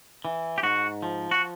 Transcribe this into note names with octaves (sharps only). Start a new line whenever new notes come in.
E3
G4
G#2 F#4
F3
F#4